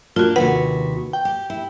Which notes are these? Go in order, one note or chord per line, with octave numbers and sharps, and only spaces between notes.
A#3 D4 F4 F#4
D#2 C3 F#4 B4 F#5
G5
G4
E4